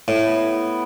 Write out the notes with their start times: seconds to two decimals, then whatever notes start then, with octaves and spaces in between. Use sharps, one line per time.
0.08 A2
0.26 B3